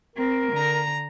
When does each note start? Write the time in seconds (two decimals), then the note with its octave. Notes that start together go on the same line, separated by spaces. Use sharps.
0.16 C4 A#4
0.52 D3 A#5